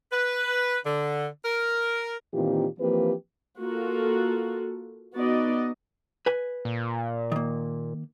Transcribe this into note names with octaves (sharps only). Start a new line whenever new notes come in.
B4
D3
A#4
A#2 D#3 E3 C4 F4 G4
E3 F3 A#3 C4 G4 B4
A#3 F4 F#4 A4
B3 D#4 F#4 D5 D#5
B4 G#5
A#2
D#3 A#3